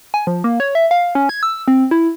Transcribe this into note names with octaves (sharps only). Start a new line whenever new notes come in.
G#5
F3
A#3
C#5
E5
F5
C#4
G#6
E6
C4
E4